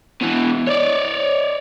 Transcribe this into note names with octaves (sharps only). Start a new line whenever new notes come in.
B2 E3
C#5 D5